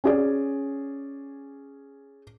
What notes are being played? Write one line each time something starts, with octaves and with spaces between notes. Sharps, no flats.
C#4 G#4 D5